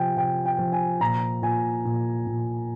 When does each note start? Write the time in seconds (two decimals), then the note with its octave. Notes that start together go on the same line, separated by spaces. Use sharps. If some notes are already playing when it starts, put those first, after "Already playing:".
Already playing: C3 F3 G5 G#5
0.17 C3 G5
0.45 G5
0.58 F3
0.72 G#5
1.01 A#2 A#5
1.42 A#2 G#5
1.85 A#2
2.27 A#2